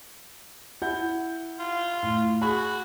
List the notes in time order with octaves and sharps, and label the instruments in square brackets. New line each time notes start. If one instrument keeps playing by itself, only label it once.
[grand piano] E4 F#5 G6
[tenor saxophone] F4
[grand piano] A2
[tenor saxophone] F#4 [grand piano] G#4 B5